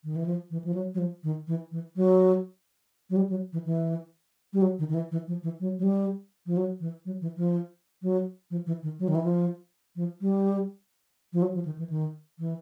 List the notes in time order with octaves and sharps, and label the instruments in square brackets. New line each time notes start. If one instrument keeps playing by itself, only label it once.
[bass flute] D#3
E3
F3
E3
F3
F#3
F#3
F3
D#3
E3
E3
F#3
F#3
G3
F#3
E3
E3
G3
F#3
D#3
D#3
E3
E3
F3
E3
F#3
F#3
G3
F3
F#3
E3
F#3
E3
F3
F#3
F3
E3
D#3
F#3
D#3
E3
F3
F3
G3
F3
F#3
F3
D#3
E3
D#3
E3